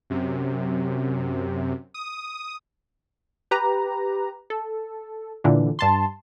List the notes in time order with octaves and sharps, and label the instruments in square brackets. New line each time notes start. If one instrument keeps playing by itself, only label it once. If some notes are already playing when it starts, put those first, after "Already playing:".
[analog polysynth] F#2 C3
D#6
G4 B4 A#5
A4
A#2 D3 E3
G2 A5 C6